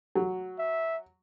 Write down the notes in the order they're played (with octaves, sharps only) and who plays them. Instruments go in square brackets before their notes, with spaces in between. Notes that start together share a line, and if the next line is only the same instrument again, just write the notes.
[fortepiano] F#3
[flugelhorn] E5